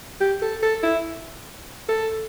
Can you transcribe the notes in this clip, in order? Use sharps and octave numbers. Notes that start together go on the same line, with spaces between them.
G4
A4
A4
E4
A4